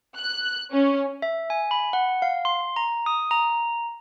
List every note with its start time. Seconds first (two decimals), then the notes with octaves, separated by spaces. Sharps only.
0.17 F#6
0.72 C#4
1.22 E5
1.50 G#5
1.71 B5
1.93 F#5
2.22 F5
2.45 C6
2.76 A#5
3.06 D#6
3.31 A#5